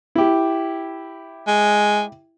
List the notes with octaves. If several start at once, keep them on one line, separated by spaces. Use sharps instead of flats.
E4 G4
G#3